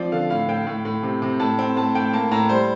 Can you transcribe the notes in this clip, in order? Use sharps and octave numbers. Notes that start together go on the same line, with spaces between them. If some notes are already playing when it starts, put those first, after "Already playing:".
Already playing: F3 C4 D5
D3 F5
A2 F5
A2 G5
A2
A2
C3
C3
A2 A5
C4
A2 A5
A2 G5
A#3 A5
A2 A#5
G3 C5